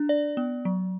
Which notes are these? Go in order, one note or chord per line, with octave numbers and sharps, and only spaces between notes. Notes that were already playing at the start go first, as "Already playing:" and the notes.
Already playing: D4
D5
B3
F#3